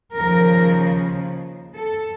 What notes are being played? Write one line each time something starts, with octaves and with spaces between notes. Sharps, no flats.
D#2 C#3 F3 A#4
A4